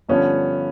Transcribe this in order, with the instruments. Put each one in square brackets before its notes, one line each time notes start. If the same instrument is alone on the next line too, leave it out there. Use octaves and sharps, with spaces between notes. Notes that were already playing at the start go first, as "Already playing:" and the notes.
[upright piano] G2 D3 F3 B3 C#4